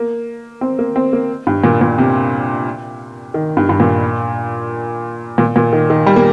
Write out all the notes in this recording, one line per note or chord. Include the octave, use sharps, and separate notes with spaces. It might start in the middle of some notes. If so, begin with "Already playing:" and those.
Already playing: A#3
C4
A#3
C4
A#3
G2
A#2
A#2
C3
D#3
G2
G2
A#2
A#2
A#2
D#3
D#3
G3
A#3